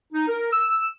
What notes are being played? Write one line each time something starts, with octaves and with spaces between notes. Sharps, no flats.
D#4
A#4
E6